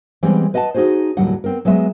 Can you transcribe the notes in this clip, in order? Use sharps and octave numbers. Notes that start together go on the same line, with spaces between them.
E3 G3 G#3 B3 C4
B4 D#5 F#5 G5 A5
D#4 F4 F#4 G#4 C5
D#2 A2 C#3 F#3 G3 F#5
B3 C4 A#4
F#3 G#3 B3 E5